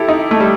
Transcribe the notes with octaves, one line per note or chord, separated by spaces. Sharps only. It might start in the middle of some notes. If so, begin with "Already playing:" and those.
Already playing: E4 G4 A4
D#4
A3
G3